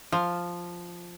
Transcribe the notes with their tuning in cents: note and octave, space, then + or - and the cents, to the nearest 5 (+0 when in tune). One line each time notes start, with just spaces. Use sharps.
F3 +0 F5 +0